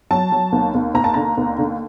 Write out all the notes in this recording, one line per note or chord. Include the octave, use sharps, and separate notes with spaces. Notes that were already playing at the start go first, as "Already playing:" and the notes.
F#3 A5
F#3
D#2
D#2
D#2 A#5
A5
D3 A#5
D#2
D3